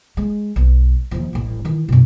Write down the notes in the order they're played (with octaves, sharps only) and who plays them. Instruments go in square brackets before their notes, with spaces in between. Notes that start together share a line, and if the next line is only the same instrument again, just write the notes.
[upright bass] G#3
B1
D#2 F3
D#1 A1
D#3 E3
F#2 B2